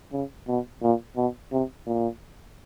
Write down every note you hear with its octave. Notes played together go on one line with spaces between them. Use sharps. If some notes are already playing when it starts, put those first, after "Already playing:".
C#3
B2
A#2
B2
C3
A#2